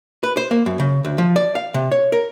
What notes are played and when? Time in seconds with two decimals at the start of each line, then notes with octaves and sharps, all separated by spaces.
0.23 B4
0.37 C5
0.51 A#3
0.66 F#2
0.80 C#3
1.05 D2
1.18 F3
1.36 D5
1.55 F5
1.74 C3
1.91 C#5
2.12 A#4